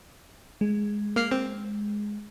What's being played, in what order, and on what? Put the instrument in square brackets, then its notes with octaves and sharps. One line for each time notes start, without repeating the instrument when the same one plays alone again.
[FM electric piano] G#3
[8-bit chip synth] A#3 F6 C7
C4